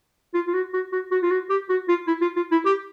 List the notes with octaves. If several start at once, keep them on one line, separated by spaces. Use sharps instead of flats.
F4
F4
F#4
F#4
F#4
F#4
F4
F#4
G4
F#4
F4
E4
F4
F4
E4
G4